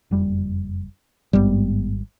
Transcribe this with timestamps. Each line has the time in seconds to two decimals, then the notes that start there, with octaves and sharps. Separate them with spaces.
0.11 F#1 F2 G3
1.33 G#1 G2 G3 G#3 B3